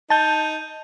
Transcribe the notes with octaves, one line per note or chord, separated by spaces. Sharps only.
D#4 A5 G6